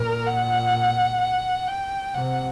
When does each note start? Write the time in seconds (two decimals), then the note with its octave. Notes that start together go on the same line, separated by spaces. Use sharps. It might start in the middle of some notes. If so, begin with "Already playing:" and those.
Already playing: A#2 A#4
0.26 F#5
1.20 F#5
1.67 G5
2.14 C3 F#5